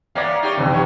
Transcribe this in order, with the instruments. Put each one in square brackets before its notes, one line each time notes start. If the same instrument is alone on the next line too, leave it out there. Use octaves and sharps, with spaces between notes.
[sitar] A#3 B3 C#4 [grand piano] D5 E5 F5
[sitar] D#4 G4 C#5
[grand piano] F#1 C3 G5 [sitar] G2 E3
[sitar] G2 B2 C#5